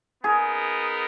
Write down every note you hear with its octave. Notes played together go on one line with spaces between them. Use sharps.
B3 D#4 G#4 A#4